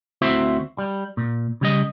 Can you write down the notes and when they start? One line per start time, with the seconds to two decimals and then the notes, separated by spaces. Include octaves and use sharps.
0.22 D2 C4 E4 F#4 C5 E5
0.78 G3
1.17 A#2
1.61 C#3 G3 D#5